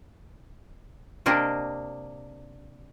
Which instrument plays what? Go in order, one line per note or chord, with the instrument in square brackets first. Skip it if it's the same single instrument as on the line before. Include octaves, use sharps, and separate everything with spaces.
[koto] C3 A#3 D4 D#5